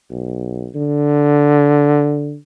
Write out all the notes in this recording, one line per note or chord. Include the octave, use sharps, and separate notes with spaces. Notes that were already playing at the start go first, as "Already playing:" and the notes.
B1
D3